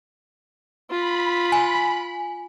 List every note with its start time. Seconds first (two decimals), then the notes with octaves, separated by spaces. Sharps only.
0.91 F4 B5
1.52 G#5